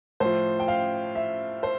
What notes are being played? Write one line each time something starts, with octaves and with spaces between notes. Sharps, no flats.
A2 F3 C5
G5
F5
E5
C5